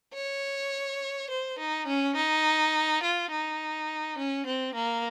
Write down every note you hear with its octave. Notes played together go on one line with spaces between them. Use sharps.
C#5
C5
D#4
C#4
D#4
F4
D#4
C#4
C4
A#3